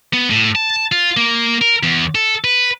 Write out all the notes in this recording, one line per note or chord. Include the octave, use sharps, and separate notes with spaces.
B3
A2
A5
F4
A#3
A#4
E2
A4
B4